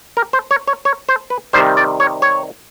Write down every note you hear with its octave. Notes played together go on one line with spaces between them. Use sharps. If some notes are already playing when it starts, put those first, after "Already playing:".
A#4
C5
C#5
C#5
C#5
C5
B4
C3 D#3 G3 C5
D5
C#5
C#5